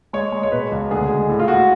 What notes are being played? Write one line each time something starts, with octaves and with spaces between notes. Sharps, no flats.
G#3 C#5
G#3
C#5
B2 B4
C#2
D2 G#4
G#3
A2
F4
A2 F#4